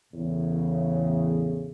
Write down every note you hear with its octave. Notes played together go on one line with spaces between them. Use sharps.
E2 A2 C#3